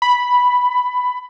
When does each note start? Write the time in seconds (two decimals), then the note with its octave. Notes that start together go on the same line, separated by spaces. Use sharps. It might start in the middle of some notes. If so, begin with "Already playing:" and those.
0.02 B5